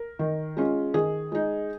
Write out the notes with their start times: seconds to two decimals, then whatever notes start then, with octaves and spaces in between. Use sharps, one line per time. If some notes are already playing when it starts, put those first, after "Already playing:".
Already playing: A#4
0.19 D#3
0.57 G#3 C#4 F4
0.94 D#3 G#4
1.32 G#3 D#4